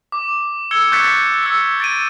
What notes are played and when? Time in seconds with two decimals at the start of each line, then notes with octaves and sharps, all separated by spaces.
0.12 D6
0.71 E6 G#6 C#7 G7
0.92 C#6 F#6 G6 A6 B6 C#7
1.43 E6 G#6 C#7
1.80 A6 D7 D#7